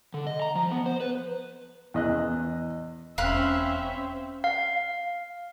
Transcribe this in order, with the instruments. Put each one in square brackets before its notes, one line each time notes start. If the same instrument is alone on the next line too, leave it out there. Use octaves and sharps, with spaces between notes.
[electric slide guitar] D3
D#5
A#5
F3
B3
C5
B4
[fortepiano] E2 D#5 F#6
[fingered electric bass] E1 [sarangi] C4 [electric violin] C#4 E5 [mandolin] F5 B5 F#6
[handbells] F5